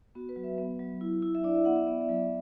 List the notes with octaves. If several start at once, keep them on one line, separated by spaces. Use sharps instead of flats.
B3 F#4
B4
F#3
E5
B3
F#3
E4
E4
E5
D4 D5
E5
B3 F#5
E5
B3 D5
E5
F#3
E5